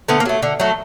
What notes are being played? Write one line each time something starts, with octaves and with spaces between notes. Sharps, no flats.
D3 A3 B3
A#3
F#3 A3
D3
F#3 A3